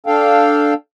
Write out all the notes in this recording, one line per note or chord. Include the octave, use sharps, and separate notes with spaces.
D4 A4 F5 G5